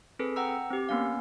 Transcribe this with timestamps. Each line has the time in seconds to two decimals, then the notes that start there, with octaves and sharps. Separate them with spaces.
0.19 C4 G#4 A4 B4
0.36 F#5 G5 A#5 E6
0.70 C4 G4
0.89 A#3 B3 C#4 F5